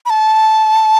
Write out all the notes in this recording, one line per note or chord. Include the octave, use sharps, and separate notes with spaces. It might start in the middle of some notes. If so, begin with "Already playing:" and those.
B5
A5